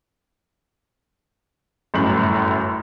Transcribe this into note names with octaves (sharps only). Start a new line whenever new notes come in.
G1 F#2 A2 F#7